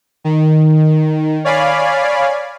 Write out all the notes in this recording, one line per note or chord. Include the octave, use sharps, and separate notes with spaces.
D#3
C#5 D5 F5 G#5 B5